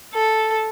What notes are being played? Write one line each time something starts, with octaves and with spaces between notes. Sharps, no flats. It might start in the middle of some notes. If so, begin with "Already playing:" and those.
A4